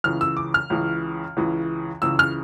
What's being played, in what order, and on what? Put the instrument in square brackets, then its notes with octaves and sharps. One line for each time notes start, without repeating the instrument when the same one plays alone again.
[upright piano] C#2 C#3 E3 F6
E6
D6
F6
C#2 C#3 E3
C#2 C#3 E3
C#2 C#3 E3 E6
F6